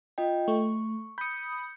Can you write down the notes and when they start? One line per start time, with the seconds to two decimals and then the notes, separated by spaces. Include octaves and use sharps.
0.18 F4 D#5 G5
0.48 A3 C#6
1.18 B5 D#6 G6 C#7